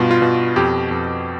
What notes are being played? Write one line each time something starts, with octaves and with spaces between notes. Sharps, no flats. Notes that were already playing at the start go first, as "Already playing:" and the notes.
Already playing: G2 B2 F4
F4
B2
F2 G4
F2